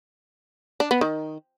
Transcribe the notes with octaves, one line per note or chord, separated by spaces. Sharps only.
D4
B3
D#3